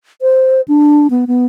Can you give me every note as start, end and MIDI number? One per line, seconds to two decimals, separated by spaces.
0.22 0.61 72
0.68 1.07 62
1.10 1.25 59
1.27 1.46 59